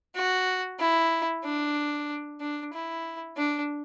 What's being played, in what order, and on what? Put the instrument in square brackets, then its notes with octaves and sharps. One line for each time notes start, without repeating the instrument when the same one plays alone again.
[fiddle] F#4
E4
D4
D4
E4
D4